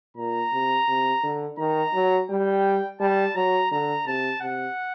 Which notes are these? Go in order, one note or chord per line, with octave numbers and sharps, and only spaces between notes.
A#2 A#5
C3
C3
D3
D#3 A#5
F#3
G3 G5
G3 A5
F#3 A#5
D3 A#5
C3 A5
C3 F#5